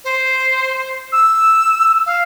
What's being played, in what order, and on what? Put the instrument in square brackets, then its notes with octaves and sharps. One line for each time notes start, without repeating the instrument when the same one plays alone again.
[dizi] C5
E6
F5